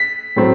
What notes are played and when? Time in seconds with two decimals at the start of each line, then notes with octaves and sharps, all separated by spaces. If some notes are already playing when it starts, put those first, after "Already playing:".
Already playing: B6
0.36 A2 F#3 C4